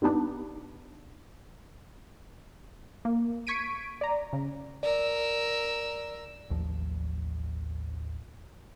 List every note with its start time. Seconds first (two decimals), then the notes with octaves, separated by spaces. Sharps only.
0.02 G2 G3 B3 D4 D#4
3.05 A#3
3.47 C#6 G#6 B6 D7 D#7
4.01 D5 A#5
4.33 C#3
4.83 A#4 D5 E6
6.50 A1 D#2 F3